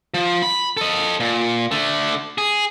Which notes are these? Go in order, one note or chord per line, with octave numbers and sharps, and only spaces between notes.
F3
B5
A4 D#5
A#2
D3 A3
G#4